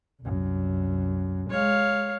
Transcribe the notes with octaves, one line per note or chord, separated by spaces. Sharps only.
C2 F#2
G#3 C#5 F5